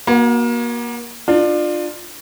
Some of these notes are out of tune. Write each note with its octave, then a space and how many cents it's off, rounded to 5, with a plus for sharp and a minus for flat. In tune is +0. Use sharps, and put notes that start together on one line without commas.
A#3 +30 F#4 -5
D4 +30 F4 +10